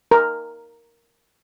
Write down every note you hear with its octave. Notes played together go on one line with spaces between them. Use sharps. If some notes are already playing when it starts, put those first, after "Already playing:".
A#4